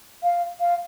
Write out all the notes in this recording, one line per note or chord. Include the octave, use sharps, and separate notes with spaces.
F5
F5